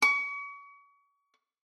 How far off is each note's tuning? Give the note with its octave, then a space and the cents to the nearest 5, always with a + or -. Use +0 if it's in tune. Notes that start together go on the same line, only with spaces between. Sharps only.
C#6 +35